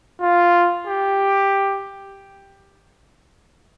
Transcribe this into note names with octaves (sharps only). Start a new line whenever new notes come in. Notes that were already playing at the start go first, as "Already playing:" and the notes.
F4
G4